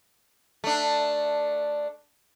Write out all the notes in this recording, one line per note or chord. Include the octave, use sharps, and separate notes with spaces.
A3 D4